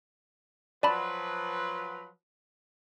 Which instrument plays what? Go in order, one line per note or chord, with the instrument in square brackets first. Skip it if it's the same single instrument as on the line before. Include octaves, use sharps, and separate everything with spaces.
[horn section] F3 F#3 B4 [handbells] D5 A5 B5